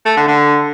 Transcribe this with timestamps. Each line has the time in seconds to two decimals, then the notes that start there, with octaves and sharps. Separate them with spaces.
0.06 A3
0.17 D3
0.28 D3